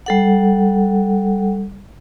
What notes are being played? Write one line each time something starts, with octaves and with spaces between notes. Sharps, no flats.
G3 A4 F#5